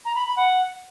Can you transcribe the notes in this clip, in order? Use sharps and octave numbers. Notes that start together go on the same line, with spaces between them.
A#5
B5
B5
F#5